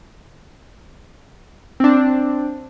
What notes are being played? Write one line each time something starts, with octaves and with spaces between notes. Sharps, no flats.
C4 D4